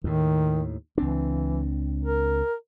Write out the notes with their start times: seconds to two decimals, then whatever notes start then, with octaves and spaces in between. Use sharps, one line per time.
0.04 D#2 A2 D#3
0.98 C#2 E3 C4 D4
2.05 A#4